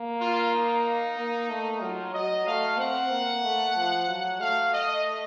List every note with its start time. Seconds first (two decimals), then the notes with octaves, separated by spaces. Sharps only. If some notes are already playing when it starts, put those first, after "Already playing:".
Already playing: A#3
0.20 F4
0.52 D#4
1.18 A#3
1.50 A3
1.81 F#3 F4
2.14 F#3 D#5
2.46 A3 F5
2.79 C4 F#5
3.11 A#3
3.44 A3
3.76 F3
4.09 F#3
4.40 A3 F5
4.72 D#5